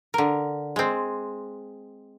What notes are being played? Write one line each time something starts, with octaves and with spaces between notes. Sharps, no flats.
D3 A#4
G#3 C4